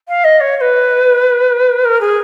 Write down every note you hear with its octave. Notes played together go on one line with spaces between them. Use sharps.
F5
D#5
C#5
C#5
B4
A#4
G#4